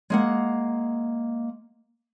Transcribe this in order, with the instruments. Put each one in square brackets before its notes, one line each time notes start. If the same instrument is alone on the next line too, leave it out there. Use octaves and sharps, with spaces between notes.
[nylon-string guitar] G#3 A#3 F#5